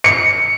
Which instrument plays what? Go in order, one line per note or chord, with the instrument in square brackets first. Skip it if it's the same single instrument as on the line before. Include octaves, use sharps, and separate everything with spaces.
[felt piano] C#7